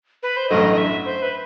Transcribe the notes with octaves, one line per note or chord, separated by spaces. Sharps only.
B4
C5
A1 G2 F#3 A3 D#5
D#5
E5
C5
B4